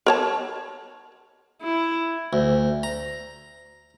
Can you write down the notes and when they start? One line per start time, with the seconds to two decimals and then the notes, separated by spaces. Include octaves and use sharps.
0.07 A#4 C#5 A5
1.62 E4
2.33 D2
2.83 A#5